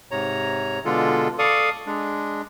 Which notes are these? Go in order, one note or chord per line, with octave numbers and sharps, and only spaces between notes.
G#2 C3 C#5 A#5
B2 D3 G#3 D4 F4 A4
A4 D5 F5 C#6 D#6
G#3 D4